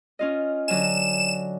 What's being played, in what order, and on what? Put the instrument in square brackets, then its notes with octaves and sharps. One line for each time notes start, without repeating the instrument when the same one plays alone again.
[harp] C#4 F4 D#5
[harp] D3 F#3 G#5 [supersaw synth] E7